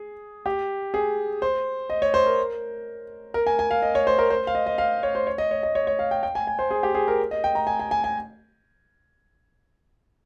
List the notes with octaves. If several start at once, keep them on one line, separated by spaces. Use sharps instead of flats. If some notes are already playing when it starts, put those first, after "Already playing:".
Already playing: G#4
G4
G#4
C5
D#5
C#5
C5
A#4
A#4
G#5
G#5
F5
D#5
C#5
C5
A#4
C5
F5
D#5
D#5
F5
C#5
C5
C#5
D#5
C#5
D#5
C#5
C#5
F5
G5
G5
G#5
G#5
C5
G#4
G4
G#4
A#4
D#5
G5
A#5
G#5
G#5
G#5
G#5